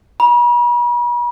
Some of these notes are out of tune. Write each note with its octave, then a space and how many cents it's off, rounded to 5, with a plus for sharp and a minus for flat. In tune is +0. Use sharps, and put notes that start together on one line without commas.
B5 -45